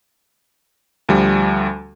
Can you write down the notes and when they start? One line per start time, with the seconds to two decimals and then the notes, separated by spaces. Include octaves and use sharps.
1.09 D2 F3 G3